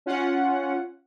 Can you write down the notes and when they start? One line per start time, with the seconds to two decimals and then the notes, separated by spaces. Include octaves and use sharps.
0.06 C#4 F4 F#5